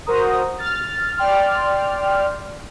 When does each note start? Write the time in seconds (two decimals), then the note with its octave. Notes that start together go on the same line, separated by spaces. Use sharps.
0.06 F#4 A#4 C5 A#5 D#6
0.59 F6 A6
1.17 D5 G5 C6 F6